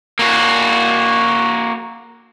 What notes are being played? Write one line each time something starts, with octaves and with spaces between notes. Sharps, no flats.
A#3 F#4